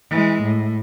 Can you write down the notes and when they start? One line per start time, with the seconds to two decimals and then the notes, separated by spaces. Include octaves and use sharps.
0.10 E3 G#3
0.43 A2